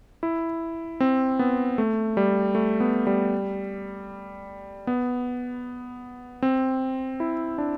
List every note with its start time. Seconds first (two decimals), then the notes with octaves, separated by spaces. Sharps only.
0.23 E4
1.00 C4
1.39 B3
1.78 A3
2.17 G3
2.55 A3
2.80 B3
3.07 G3
4.87 B3
6.42 C4
7.20 E4
7.58 D4